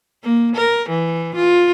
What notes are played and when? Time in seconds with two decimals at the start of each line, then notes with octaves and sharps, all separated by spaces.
0.23 A#3
0.56 A#4
0.89 E3
1.35 F4